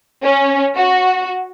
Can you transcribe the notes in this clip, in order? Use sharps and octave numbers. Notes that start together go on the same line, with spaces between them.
C#4
F#4